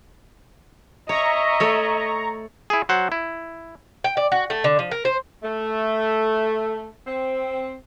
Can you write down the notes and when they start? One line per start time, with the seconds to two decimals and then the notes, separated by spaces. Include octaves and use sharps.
1.09 C#5 D#5 E5 A#5 C#6
1.60 A3 C#5
2.70 E4 G#4
2.89 F#3 C5 F#5
3.12 E4
4.04 G5
4.17 D5
4.32 F#4
4.50 A3
4.64 D3
4.79 F3
4.91 A#4
5.05 C5
5.43 A3
7.06 C4